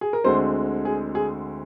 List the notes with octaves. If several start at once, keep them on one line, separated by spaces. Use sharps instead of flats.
G#4
A#4
D2 D3 G#3 C4 C5
G#4
G#4